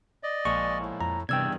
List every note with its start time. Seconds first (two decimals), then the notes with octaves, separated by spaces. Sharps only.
0.23 D5 D#5
0.45 A#1 A#2 F3 G#3 C#6
0.79 A2
1.01 F2 A#5
1.29 E2 G2 C3 D#3 D5 G5 E6 G#6